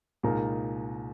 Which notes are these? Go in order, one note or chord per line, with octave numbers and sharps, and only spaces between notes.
C2 A#2 G#3 D#4 A#4